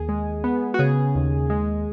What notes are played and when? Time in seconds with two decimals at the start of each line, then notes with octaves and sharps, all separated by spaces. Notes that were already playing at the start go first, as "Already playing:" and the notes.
Already playing: D#2 G#4
0.09 G#3
0.44 B3
0.74 F#4
0.79 C#3 G#4
1.15 D#2
1.50 G#3